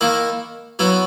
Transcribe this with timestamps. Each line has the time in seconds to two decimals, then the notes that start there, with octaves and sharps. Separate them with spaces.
0.01 D#3 A#3 E4
0.79 F#3 B3 E4